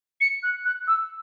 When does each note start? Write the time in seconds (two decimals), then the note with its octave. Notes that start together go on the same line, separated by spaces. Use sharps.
0.21 C#7
0.43 F#6
0.65 F#6
0.88 E6